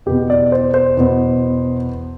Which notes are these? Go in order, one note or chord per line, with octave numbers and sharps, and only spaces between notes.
E2 B2 B3 G4
D5
C5
C5
E2 B2 B3